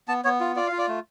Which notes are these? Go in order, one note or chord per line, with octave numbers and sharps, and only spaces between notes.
B3 A5
B3 C#5
F4
F4 D5
F4 F5
D5
A3